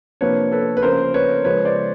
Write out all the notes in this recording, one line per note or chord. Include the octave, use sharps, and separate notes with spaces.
C3 F3 A#3 D4 B4 C#5
A4 B4
B4
C#3 F3 A#3 C#4 A#4 C5
B4 C#5
C#3 F3 G#3 B4 C#5
C5 D5